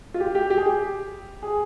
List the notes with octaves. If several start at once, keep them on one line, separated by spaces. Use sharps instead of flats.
F4
G4
G4
G4
G#4
G4
G#4